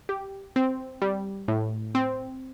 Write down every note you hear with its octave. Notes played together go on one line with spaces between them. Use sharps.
G4
C4
G3
A2
C4